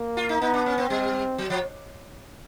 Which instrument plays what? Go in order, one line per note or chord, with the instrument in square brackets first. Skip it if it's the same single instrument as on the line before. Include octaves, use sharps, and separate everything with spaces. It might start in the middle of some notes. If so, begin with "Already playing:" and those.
Already playing: [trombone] A#3
[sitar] F4
D#4
[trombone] B3 [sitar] D#4
[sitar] D4
C#4
C4
[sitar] G3 [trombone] C4
[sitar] F#3
F3